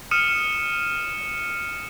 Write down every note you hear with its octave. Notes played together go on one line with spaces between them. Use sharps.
D#6 F6 C#7 D#7 E7